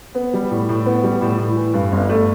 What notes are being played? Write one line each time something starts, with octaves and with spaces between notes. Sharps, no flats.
B3
G3
A2
A2
B3
G3
A2
A2
E3
G2
G1
A3